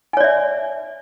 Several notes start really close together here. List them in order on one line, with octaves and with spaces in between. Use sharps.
G#5 C#5 D5 E5